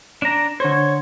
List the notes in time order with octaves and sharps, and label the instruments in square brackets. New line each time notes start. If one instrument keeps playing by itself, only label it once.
[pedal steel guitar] D4 A#5
[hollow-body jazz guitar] D3 C5 [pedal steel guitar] C#5